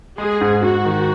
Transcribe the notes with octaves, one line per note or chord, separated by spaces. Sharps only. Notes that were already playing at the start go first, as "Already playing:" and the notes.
G#3 G#4
G#2
G#2 F#4
D#3